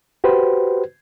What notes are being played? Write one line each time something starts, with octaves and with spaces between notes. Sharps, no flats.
F#4 G4 B4 C5